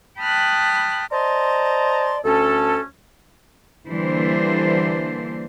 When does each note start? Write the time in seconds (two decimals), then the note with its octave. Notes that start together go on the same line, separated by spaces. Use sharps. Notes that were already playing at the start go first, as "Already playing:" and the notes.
0.19 G5 A5 B5 D#6 F6 F#6
1.12 C5 D5 D#5 A5 A#5 C6
2.24 D2 C#4 A4
3.89 D3 E3 G3 A#3 D4 C5